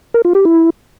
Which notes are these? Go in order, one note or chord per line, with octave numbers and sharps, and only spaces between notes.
A#4
F4
G4
E4